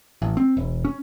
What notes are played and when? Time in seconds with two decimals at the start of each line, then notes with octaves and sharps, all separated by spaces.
0.22 A1
0.37 C4
0.57 E1
0.85 C#4